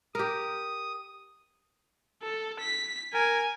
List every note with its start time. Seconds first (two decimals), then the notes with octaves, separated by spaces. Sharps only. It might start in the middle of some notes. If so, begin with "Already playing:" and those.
0.15 G4 A#4 D#6
2.22 A4
2.60 B6
3.14 A#4 G#5